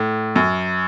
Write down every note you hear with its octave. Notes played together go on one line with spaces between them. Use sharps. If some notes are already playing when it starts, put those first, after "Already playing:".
Already playing: A2
F#2